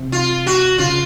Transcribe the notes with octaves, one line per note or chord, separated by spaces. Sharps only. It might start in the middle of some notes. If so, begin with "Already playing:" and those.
Already playing: C3
F4
F#4
C#3 F4